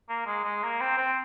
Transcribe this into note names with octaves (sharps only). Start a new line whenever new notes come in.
A#3
G#3
G#3
A#3
C4
C4